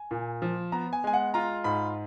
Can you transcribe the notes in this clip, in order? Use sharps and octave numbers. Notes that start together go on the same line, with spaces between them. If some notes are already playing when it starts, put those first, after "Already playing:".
Already playing: G#5
A#2
F3
B3 A#5
G#5
G#3 G#5
F#5
F4 A#5
G#2 B5